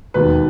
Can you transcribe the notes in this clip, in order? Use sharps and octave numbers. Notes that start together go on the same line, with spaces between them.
E1 D#2 D#3 B4